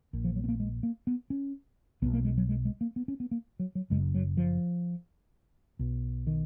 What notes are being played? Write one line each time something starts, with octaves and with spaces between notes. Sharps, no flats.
A#1 A#2
F3
F#3
B3
A#3
G#3
A#3
B3
C#4
B1 B2 B3
A#3
G#3
F#3
G#3
G#3
A#3
B3
C#4
B3
A#3
F#3
F#3
F#1 F#2 C#3 G#3
F#3
F3
B1 B2
D#3